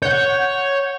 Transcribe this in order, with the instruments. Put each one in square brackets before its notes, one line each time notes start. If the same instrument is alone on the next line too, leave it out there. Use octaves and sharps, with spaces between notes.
[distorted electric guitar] C#5 [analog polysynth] F#5 G6